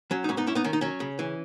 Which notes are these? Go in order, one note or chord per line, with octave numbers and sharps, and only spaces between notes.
F#3 C#4
D#4
G#2 C#4
B3 D#4
G#2 C#4 E4
B3 D#4
D#3 C#4
D#4
F#3 C#4
C#3
E3